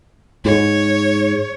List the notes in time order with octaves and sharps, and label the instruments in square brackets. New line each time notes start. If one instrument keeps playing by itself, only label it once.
[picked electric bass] G#2 [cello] C#5